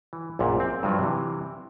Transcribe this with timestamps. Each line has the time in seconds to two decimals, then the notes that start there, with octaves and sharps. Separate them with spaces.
0.13 E3
0.39 A#1 F#2 A#2
0.60 C4
0.83 G2 F3 F#3
0.98 C3 E3